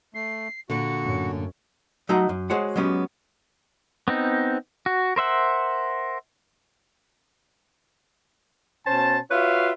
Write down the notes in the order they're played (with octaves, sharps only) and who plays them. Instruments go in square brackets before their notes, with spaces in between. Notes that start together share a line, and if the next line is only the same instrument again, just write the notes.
[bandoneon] A3 [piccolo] C7
[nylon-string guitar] A#2 D3 [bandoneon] F#4 [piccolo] C#7
[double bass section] F#2 A2 C#4
[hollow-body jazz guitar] F#3 A3 D#4 D#5 F#5 A#5
F#2
G#3 F#4 G#4 C5 C#5 F#5
F#3 G#3 B3 C#4 G4
[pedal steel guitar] B3 C4 D#4
F#4
A#4 C5 E5 F#5
[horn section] B2 C#4 C5 A5
F4 F#4 B4 C#5 E5 F5